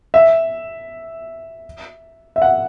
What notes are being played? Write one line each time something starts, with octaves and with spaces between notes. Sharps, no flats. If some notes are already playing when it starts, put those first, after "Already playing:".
E5
E5
F#5